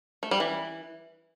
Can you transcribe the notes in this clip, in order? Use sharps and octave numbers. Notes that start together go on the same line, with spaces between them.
A3
G3
E3